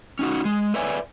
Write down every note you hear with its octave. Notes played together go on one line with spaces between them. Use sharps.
C#4 D#4 F#4
G#3
A4 B4 C#5 D5 E5 G#5